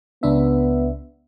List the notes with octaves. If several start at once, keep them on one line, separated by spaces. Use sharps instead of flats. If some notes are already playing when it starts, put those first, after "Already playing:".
C#2 B3 D4 E5